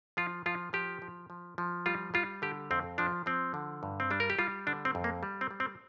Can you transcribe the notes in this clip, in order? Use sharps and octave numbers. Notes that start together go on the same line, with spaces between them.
F3 F4
F3 F4
F3 G4
F3
F3
F3
G3 F4
G3 F4
D3 G4
F2 C4
F3 D4
F3 C4
D3
G2
C4
G3 D4
A#4
G4
G3 F4
D3 D4
C4
F2
A#3
G3
C4
G3
C4